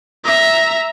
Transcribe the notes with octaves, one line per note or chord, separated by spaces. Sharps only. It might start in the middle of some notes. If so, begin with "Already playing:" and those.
E5 A#5